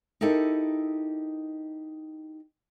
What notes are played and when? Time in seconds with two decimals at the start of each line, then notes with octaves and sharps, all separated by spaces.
0.21 D#4 E4 G4 A4 A#4 D#5